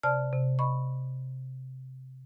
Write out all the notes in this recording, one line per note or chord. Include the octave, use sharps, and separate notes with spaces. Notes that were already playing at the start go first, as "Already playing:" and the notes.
C3 D5 A5 F6
C3
D#5 B5 C#6